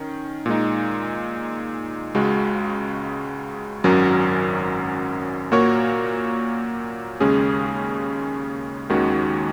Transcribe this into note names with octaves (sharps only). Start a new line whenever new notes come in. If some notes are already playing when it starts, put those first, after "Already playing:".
Already playing: D#3 C#4
A#2 G#3 D#4
C#2 C#3 G#3 F#4
G#1 F#2 F#3 C#4 A#4
A#2 A#3 F#4 A#4 C#5
D#2 C#3 G#3 C#4 G#4
D#2 D#3 G#3 C#4 F#4